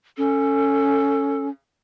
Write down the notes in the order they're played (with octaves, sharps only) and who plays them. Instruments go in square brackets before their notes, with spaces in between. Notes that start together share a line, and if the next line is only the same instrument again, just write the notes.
[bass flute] C#4 [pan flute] A4